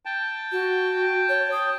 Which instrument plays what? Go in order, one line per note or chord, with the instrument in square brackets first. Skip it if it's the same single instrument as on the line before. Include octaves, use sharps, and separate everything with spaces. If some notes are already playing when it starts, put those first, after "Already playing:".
[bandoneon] G5 A5
[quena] F#4
C#5
D#6